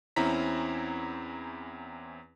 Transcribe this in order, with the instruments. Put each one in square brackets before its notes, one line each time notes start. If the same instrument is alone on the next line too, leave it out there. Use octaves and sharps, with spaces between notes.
[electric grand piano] E2 C4 C#4 E4 A#5 B6